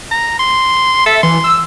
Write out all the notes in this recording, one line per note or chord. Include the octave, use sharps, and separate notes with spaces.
A#5
C6
A4 E5
E3 C6
E6